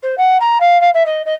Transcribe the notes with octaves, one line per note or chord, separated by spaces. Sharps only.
C5
F#5
A#5
F5
F5
E5
D#5
D#5